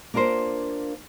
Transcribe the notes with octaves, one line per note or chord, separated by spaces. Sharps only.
A#3 D4 F4 A#4 C5